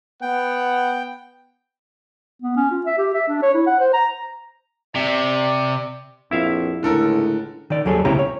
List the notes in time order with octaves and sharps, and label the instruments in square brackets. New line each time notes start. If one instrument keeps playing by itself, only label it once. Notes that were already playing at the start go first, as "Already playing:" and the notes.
[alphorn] B3 [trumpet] F#5 [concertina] G5
[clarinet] B3
C#4
F4
E5
G4
E5
D4
C#5
E4
F#5
C5
A#5
[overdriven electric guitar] C3 [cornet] D5
[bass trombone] A#1 [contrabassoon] F2 [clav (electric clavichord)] E4 E5 F5
[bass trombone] C#2 [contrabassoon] A2 [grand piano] D3 A4 A#4
[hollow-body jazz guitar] D#3 D5
D#2 F#3 G3 G#4 A4
C#2 C3 C#4 E4 G4 A#5
C#5